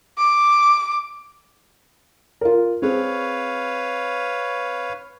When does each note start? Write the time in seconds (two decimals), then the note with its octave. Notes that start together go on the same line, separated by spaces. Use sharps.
0.18 D6
2.41 F4 A#4
2.82 C4 G#4 B4 C#5 F5